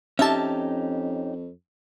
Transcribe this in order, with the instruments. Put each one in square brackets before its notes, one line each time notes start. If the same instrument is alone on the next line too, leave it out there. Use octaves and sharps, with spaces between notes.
[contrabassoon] F2 [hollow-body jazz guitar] C#4 D#4 G4 [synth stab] E5 A5